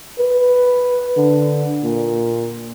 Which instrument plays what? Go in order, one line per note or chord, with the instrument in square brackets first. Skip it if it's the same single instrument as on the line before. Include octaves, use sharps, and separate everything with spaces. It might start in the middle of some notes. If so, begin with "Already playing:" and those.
[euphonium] B4
D3
A#2